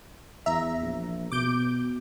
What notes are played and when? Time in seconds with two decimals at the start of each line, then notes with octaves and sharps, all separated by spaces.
0.46 E2 E5 A#5
0.81 A#1
1.32 B2 D6 G6 D7